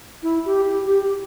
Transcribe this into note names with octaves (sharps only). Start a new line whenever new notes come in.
E4
G4
G4
G4
G4